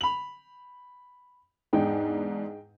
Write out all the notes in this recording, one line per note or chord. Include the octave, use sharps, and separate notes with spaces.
B5 F7 F#7
E2 G#2 D4 D#4 G#4 G5